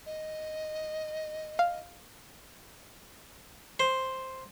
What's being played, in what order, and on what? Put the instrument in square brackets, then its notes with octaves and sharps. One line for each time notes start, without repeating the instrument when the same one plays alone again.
[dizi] D#5
[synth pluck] F5
[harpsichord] C5